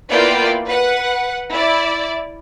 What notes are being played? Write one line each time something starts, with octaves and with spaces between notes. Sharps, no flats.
A#3 B3 E4 F4 D5 G5
B4 F#5
E4 D5